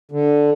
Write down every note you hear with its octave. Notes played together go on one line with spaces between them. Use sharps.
D3